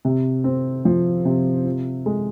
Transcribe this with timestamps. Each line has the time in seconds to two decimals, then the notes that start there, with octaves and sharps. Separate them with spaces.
0.05 C3
0.44 C4
0.85 F3
1.25 C3
1.65 F4
2.06 G#3